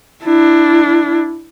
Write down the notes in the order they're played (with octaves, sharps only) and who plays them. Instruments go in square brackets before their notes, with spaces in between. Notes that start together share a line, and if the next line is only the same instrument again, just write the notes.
[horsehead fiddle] D4 E4